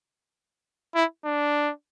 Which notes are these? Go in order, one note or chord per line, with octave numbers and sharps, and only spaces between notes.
E4
D4